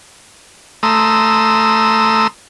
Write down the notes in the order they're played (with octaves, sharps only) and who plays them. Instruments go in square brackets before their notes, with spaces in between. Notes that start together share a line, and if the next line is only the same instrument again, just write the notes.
[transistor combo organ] A3 A#5 C6 D#6 E6